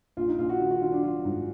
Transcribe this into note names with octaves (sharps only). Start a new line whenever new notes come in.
A#1 F4
D#4
A#1 F4
F#4
D#3 F#4
F#4
D#3 F4
D4
F#3 F4
G#2